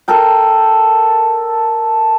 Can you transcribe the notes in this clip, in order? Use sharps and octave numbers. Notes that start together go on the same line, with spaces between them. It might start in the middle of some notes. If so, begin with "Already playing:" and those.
A4 A#4 G5